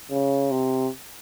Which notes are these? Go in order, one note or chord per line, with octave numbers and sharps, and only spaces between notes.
C#3
C3